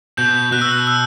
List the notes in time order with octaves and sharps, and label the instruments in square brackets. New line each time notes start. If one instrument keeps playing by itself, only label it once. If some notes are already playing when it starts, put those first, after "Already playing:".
[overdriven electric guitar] B2 [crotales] G6
[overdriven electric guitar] B2 [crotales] F#6
[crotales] E6
F#6
E6